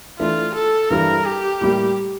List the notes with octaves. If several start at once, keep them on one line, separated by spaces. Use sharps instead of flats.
E3 A3 D4 F4
A4
G2 E3 G3 A#4
G4
A2 G3 A#3